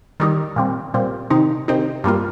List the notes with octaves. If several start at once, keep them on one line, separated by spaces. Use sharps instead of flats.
D#3 G3 D#4
A#2 G3 C4
A#2 G3 C4
C3 D#3 C4 D#4
C3 D#3 C4 D#4
G2 G3 A#3 F4